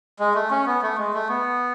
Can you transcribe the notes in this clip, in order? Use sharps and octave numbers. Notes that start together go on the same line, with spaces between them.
G#3
A3
C#4
B3
A3
G#3
A3
B3